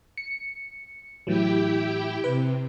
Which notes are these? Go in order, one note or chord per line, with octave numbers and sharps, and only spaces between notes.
C#7
A2 E3 F#3 E4 G4 G5
C3 B4